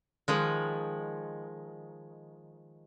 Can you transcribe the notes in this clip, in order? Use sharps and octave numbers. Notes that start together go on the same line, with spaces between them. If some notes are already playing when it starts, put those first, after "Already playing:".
D#3 F3 G#3